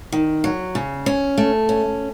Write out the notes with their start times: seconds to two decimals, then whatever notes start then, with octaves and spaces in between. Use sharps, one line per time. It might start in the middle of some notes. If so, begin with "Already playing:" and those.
0.12 D#3
0.44 F#3
0.75 C#3
1.06 C#4
1.38 A3
1.69 C#4